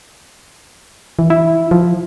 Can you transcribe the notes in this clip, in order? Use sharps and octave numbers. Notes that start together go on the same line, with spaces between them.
E3
E4
F3